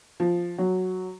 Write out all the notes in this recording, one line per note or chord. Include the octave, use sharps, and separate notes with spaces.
F3
F#3